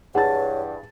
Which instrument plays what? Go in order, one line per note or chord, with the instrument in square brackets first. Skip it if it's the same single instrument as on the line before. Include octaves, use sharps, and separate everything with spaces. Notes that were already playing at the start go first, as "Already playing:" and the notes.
[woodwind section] G2 E3 [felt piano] G#4 A5 A6 [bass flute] C#5 [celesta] F#5